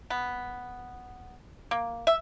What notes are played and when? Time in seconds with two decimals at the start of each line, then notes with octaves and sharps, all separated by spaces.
0.10 B3
1.71 A#3
2.07 E5